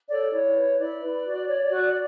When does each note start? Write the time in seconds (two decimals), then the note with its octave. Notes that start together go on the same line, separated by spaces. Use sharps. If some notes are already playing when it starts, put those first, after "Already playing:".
0.09 A4 C#5 D5
0.32 E4 C#5
0.55 B4
0.78 E4 D5
1.02 B4
1.25 F#4
1.48 C#5
1.71 F#4